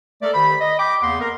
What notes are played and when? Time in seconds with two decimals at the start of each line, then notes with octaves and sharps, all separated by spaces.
0.22 A3 A4 A#4 D5
0.34 D#3 G4 C5 B5
0.61 D#5
0.79 G5 B5 D6
1.02 E2 C#3 A#3 B3 F#5 C6
1.22 A#4